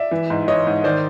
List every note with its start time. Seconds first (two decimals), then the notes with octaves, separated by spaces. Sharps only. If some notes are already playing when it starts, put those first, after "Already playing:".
Already playing: D5 E5
0.11 E3
0.30 G#2
0.48 E3 C#5 D#5
0.67 G#2
0.84 D#3 C5 D5